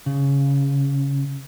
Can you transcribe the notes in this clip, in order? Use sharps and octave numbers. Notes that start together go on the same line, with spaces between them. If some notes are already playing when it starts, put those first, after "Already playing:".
C#3